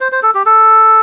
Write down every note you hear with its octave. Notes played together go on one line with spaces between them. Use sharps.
C5
C5
A4
G4
A4